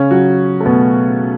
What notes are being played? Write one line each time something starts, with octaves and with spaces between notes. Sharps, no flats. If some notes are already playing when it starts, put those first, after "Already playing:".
Already playing: C#3 C#4
F#3 F#4
A3
B2 B3